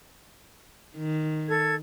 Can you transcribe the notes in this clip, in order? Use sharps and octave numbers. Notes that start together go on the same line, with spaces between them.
D#3
A4 G#6